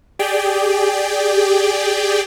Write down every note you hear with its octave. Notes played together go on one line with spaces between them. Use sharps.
G4 G#4 D5 G5